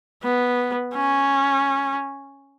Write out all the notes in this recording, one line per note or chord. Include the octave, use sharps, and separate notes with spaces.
B3
C#4